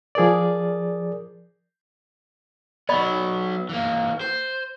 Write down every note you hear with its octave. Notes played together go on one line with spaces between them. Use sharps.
F3 G#4 A#4 D5
F#3 B3 D5 D#5 B5
E3 A#3
C5